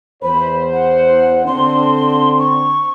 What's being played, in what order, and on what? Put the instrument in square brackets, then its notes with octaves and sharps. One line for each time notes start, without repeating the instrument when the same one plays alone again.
[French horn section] E2 C5 [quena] B5
[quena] F#5
[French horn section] D3 C4 D4 [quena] C6
[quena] C#6